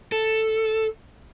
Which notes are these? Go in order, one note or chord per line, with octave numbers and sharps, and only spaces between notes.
A4